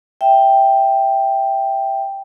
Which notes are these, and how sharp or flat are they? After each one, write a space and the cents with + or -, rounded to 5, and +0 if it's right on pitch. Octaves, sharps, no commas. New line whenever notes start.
E5 +0 G5 +0